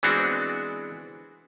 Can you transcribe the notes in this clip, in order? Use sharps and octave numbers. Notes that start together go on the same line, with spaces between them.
E3 G#3 B3 C4 D4 F#4